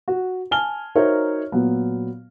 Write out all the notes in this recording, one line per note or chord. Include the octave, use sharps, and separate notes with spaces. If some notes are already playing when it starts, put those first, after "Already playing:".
F#4
G#5 A5 F6 G7
D#4 F#4 A#4 C5 C#5 E5
A#2 F#3 B3